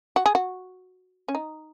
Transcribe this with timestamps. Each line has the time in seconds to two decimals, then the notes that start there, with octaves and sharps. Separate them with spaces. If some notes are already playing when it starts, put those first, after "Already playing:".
0.16 F#4
0.26 G#4
0.35 F#4
1.28 C#4
1.35 D#4